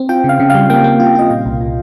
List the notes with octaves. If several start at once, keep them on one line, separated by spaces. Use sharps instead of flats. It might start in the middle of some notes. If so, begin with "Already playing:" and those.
Already playing: C4
F4 G5
C#3
F5
C#3
G3 F5
A#3 G5
A#3
F4
F4 D#5
A#2 F5
C2
A#2